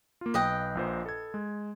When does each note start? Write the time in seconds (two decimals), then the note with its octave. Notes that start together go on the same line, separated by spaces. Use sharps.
0.21 A#3 F4
0.34 B1 B4 D#5 G5
0.75 A#1 A#2 C5
1.06 A4 G#6
1.34 G#3